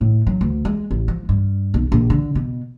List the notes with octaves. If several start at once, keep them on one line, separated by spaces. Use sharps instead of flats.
A2
F#3
D2
G#3
A1
F3
G2
B1
A#1
D3
B2